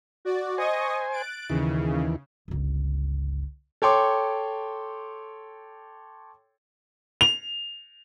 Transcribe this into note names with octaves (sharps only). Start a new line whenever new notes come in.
F#4 D5
C5 D#5 G#5 C#6 D#6
F#6 A6 D7
D#2 C#3 E3
G1 C#2
A4 C#5 G5 C6 D6
F7